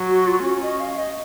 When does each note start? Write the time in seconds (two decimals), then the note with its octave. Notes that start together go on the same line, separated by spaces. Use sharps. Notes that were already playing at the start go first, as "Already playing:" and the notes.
Already playing: F#3
0.09 F#4
0.27 F4
0.44 C#4 F#4
0.62 D#5
0.80 F5
0.98 D#5